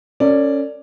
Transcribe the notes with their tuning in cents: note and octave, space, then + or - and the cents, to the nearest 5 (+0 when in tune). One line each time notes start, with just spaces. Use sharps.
C#4 +0 A4 +45 D5 +0